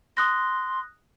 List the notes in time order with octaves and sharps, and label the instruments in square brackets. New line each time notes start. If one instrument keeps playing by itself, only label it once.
[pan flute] C6 [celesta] D#6 F#6 A#6